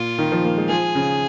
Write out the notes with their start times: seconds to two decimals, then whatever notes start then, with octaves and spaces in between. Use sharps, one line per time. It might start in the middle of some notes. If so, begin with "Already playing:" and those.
Already playing: A#2 F4
0.18 D#3
0.32 F3
0.45 A#3
0.57 G#3
0.69 F3 G#4
0.95 C#3